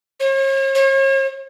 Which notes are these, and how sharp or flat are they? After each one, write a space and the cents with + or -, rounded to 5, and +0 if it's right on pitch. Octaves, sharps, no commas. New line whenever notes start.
C#5 -45
C#5 -40